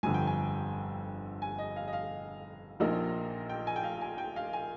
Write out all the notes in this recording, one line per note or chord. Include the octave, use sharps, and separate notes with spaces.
G1 F2 D3 G#5
G5
G#5
G#5
D#5
F5
D#5
F5
A#1 A#2 F3 A#3 D#4
G5
G#5
G5
F5
G#5
G5
F5
G#5